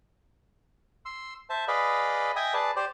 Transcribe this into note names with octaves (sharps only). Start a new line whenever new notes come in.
C6 E6
C5 E5 A5
G#4 B4 D5 D#5 F5 B5
D#5 E5 G5 G#5 D#6
G#4 B4 D5 A5
G4 C5 D5